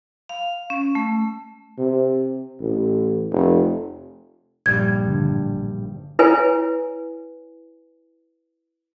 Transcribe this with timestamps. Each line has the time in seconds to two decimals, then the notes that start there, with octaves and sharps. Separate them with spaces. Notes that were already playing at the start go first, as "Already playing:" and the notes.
0.29 F5
0.70 C#4
0.95 A3
1.79 C3
2.61 A1
3.32 F1
4.66 A#1 G2 G3 G#6
5.08 A1 D3
6.19 E4 B4 C#5 G#5